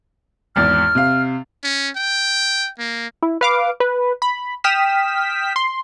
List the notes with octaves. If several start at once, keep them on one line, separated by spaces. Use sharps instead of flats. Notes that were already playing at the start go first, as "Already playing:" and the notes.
G#1 E2 F6 A6
C3 F5
C#4
G5
A#3
E4
B4 F5 D6
B4
B5
G5 D#6 F6 B6 E7
C6